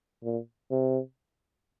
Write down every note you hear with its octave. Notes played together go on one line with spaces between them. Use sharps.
A#2
C3